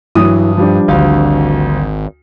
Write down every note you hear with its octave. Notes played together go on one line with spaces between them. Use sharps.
G2 E3 F#3 D#6
F3 G3 D4
G#1 D2 F5